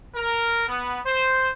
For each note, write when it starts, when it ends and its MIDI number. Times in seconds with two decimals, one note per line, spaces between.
0.15 0.66 70
0.68 0.99 59
1.06 1.50 72